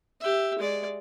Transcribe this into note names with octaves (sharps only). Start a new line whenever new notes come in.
G4 E5
G#3 D5